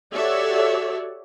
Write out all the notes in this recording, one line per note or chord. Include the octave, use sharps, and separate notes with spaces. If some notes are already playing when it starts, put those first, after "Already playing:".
F#4 G4 A4 C#5 D5 E5